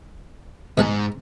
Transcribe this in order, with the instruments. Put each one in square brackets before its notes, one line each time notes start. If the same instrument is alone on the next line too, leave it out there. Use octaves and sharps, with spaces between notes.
[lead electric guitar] G#2 [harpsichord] B2 G#3 A5